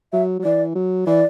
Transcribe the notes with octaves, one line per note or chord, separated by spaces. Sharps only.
F#3 E5
F#3
E3 D5
F#3
E3 D5